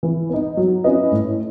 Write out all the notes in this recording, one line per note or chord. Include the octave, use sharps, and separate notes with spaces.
E3
B3 D#4
F#3
C#4 E4 B4 D#5
A2